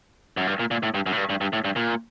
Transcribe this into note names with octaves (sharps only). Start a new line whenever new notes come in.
F#2
G2
A#2
A#2
A2
G2
F#2
A2
G2
G2
G2
A2
G2
A#2